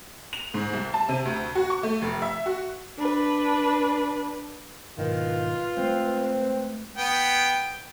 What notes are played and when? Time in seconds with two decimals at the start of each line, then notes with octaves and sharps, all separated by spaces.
0.33 F7
0.54 G#2
0.73 C2
0.94 A5
1.09 C3
1.25 D2
1.55 F#4
1.70 C#6
1.83 A3
2.02 F1
2.22 E5
2.46 F#4
2.98 D4 B4
4.98 G#2 B2 D#3 F4 B4
5.77 G#3 A3 C4
6.97 B3 G5